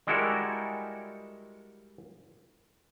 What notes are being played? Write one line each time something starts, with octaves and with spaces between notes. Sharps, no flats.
G3 G#3 E4 F#4 A4 A#4